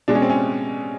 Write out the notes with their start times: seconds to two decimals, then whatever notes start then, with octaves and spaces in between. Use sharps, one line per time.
0.08 B2 G#3 D4
0.15 C#4
0.22 C4
0.30 C#4